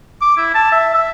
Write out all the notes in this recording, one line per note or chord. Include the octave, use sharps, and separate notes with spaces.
D6
E4
A5
E5
E5